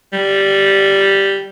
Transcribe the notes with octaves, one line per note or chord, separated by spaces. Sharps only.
G3